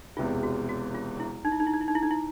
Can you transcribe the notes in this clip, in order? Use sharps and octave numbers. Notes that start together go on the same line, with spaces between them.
E1 E2 C3 E3 F4
F#4
F#4
F4
E4
D#4
E4
D#4
E4
D#4
E4
D#4
E4
D#4
E4